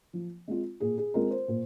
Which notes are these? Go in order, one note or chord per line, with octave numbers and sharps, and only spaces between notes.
F3
G#3 C4 F4
A#2 G#4
G#4
G#3 C4 F4 A#4
C5
A#2